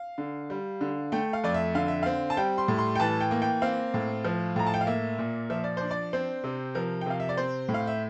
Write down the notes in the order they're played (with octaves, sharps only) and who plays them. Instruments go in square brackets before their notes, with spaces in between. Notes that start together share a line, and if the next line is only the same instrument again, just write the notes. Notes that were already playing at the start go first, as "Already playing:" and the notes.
Already playing: [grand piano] F5
D3
G3
D3
A3 G5
F5
F2 D5
E5
D3 F5
E5
C4 F5
A5
G3 G5
C6
A2
C6
G5
E3 A5
G5
A#3
G5
C4 F5
A2
F3
A2 A#5
A5
G5
F5
A#3 E5
A#2
F3 E5
D5
D4 C5
D5
C4 C5
C3
F3 A#4
G5
C3 F5
E5
D5
C4 C5
A2
F5
E5